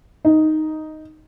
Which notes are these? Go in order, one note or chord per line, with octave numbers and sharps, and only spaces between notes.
D#4